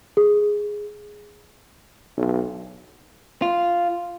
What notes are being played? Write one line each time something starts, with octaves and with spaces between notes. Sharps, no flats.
G#4
B1
F4